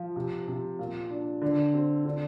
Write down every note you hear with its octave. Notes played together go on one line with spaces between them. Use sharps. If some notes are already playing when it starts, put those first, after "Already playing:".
Already playing: F3
C3
C3
A#2
D4
D3
C4
D3